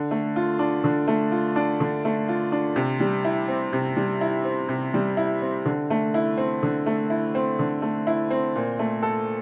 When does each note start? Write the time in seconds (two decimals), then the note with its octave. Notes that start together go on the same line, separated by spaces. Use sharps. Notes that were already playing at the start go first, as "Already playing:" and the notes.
Already playing: D3
0.11 A3
0.36 F4
0.59 D4
0.84 D3
1.08 A3
1.32 F4
1.56 D4
1.80 D3
2.05 A3
2.28 F4
2.52 D4
2.76 C3
3.00 G3
3.25 E4
3.48 C4
3.73 C3
3.97 G3
4.21 E4
4.45 C4
4.69 C3
4.94 G3
5.17 E4
5.42 C4
5.66 D3
5.90 A3
6.14 E4
6.37 C4
6.63 D3
6.86 A3
7.10 E4
7.35 C4
7.59 D3
7.82 A3
8.07 E4
8.30 C4
8.56 A#2
8.79 A3
9.03 A4